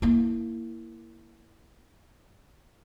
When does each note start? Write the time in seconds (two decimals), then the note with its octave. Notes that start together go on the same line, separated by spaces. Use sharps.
0.02 A#3 E4